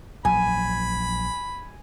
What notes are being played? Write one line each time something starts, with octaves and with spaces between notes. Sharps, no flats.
A#1 F#3 G#5 B5